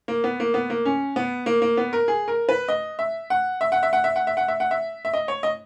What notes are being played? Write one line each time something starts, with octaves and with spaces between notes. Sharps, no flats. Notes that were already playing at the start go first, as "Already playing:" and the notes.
A#3
B3
A#3
B3
A#3
C#4
B3
A#3
A#3
B3
A#4
G#4
A#4
B4
D#5
E5
F#5
E5
F#5
E5
F#5
E5
F#5
E5
F#5
E5
F#5
E5
E5
D#5
C#5
D#5